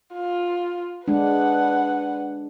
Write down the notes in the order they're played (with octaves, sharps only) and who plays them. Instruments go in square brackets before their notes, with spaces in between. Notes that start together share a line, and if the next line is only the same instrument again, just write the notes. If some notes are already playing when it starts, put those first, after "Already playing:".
[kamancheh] F4
[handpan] G#3 D4 [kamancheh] B4 F#5